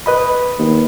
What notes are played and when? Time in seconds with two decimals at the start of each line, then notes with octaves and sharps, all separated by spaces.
0.06 B4 D#5 B5
0.59 D#2